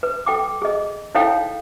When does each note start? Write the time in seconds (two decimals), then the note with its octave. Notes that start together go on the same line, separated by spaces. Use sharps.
0.03 B4
0.26 A4 G5 D6
0.62 G#4 D#5
1.15 D#4 E4 A4 C#5 F5 G5